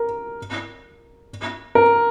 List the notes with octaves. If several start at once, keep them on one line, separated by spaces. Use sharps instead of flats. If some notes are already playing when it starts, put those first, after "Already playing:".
Already playing: A#4
A#4